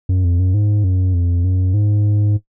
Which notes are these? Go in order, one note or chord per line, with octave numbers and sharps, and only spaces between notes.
F#2
F2
F#2
G#2
F#2
F2
F#2
G#2